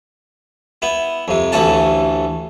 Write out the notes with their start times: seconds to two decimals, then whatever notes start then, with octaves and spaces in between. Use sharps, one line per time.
0.82 B3 E4
1.28 F2 C3
1.52 A1 D2 E3 A3 C#4 A5